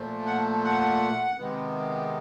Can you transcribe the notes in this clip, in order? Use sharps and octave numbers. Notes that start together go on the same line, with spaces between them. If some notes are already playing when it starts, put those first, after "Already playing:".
Already playing: A#2 F3 A3
F#5
F#5
C3 D#3 G#3 B3